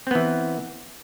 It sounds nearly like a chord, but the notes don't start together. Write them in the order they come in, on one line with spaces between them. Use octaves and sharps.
C4 B3 E3